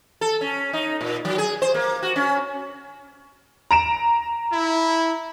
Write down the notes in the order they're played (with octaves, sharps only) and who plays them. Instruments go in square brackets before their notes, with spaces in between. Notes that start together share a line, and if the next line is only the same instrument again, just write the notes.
[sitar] A4
C#4
D#4
A#2
F#3
G#4
C5
A#3
F#4
C#4
[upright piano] A#5 D7 E7
[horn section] E4